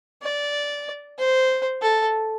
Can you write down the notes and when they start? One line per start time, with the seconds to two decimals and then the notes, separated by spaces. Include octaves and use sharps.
0.23 D5
1.19 C5
1.82 A4